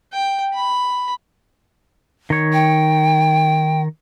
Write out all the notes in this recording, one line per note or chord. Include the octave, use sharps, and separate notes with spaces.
G5
B5
D#3 C#5
G5